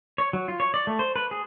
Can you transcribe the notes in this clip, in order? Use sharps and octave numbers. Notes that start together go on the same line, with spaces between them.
C#5
F#3
F4
C#5
D5
A3
C5
B4
G#4